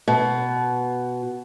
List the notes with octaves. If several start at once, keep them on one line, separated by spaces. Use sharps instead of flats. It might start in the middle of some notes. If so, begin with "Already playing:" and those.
B2